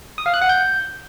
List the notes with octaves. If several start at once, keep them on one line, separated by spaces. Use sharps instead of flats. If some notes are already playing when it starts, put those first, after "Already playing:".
D#6
F5
F#6
F#5
G6